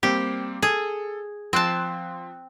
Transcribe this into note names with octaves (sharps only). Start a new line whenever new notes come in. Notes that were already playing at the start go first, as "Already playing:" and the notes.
G3 A#3 C4 G4
G#4 A4
F3 C4 A5 C6 F#6